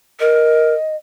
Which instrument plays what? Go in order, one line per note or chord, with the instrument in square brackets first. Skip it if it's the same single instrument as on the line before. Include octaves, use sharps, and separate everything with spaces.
[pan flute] A#4 [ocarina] D#5